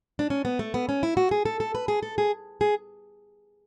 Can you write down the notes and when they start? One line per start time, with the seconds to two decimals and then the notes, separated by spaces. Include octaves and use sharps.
0.19 D4
0.30 C#4
0.45 B3
0.59 A3
0.74 B3
0.89 C#4
1.03 E4
1.17 F#4
1.31 G#4
1.45 A4
1.60 A4
1.75 B4
1.88 G#4
2.03 A4
2.18 G#4
2.61 G#4